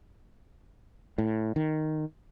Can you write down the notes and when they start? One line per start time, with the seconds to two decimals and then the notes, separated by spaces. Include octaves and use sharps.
1.18 A2
1.56 D#3